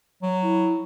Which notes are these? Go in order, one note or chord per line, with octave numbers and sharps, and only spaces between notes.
F#3
E4